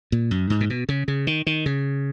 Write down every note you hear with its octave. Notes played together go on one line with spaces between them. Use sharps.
A#2
F#2
G#2
A#2
B2
C#3
C#3
D#3
D#3
C#3